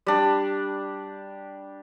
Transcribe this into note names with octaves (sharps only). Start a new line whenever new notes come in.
G3 D4